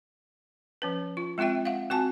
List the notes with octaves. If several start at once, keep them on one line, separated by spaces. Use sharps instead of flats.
F3 C#4 B4
F4
G#3 C4 F4 E5 G5
F5 F#5
C4 F#4 G#5 A5